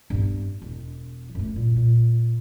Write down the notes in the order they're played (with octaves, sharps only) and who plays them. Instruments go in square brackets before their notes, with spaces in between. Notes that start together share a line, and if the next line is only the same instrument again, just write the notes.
[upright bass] G2 B3
E1
F#2 A3
A#2
A#2